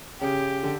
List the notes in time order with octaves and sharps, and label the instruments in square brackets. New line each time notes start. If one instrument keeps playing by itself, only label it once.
[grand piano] C#3 [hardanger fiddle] G4
[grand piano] D3